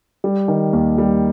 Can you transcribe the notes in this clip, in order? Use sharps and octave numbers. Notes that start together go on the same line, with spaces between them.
G3
D#3
D#2
G3